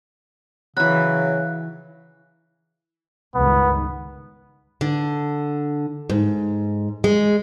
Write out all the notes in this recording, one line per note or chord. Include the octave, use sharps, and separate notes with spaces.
C#3 E3 F#3 B5 F#6
C#2 G2 D#3 B3
D3
G#2
G#3